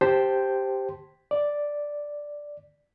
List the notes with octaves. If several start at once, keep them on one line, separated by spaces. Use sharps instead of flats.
G4 C5 G5 A5 C6
D5